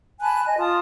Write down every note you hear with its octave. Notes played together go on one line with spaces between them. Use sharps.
G#5 A5 B5 F#6
D#5 G#5
F4 A5 D#6